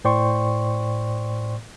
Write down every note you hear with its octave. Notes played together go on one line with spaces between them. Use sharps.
A2 C5 D5 G5 C6 C#6